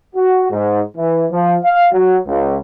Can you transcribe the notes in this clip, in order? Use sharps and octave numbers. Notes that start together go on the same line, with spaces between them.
F#4
G#2
E3
F3
F5
F#3
C#2